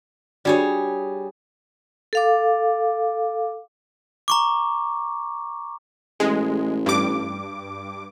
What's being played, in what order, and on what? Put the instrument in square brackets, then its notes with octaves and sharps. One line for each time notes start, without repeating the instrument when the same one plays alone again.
[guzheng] G3 G#4 C#5 [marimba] D4 F#4 D5
[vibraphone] A4 F5 D6
[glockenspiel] A#5 C#6 D6
[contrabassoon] A1 [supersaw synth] G#3
[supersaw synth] G2 D6